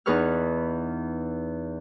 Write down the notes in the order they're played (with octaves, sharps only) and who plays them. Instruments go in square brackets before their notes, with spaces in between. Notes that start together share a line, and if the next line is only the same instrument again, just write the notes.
[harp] E2 D#4 G#4 B4 C#6 F6